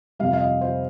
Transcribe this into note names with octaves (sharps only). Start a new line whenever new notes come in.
F2 C3 G3 F5
F5
D#5
C5